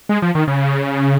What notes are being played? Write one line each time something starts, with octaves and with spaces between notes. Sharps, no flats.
G#3
F3
D#3
C#3